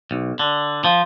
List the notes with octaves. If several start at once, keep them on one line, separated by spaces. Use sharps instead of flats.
B1
D3
F3